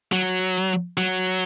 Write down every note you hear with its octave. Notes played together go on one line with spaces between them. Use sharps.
F#3
F#3